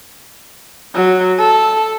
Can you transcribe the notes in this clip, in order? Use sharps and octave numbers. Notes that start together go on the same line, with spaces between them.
F#3
A4